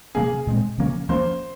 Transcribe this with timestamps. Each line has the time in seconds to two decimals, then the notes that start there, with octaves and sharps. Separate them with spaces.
0.15 C3 F#3 A#3 C#4 G#4
0.47 A#2 G#3 C4
0.78 C#3 F3 A#3 C#4
1.09 F3 A#3 C#4 C5